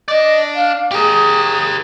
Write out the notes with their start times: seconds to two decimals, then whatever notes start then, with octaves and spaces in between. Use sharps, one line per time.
0.08 D4 D5 D#5
0.54 F5
0.91 G4 G#4 A#4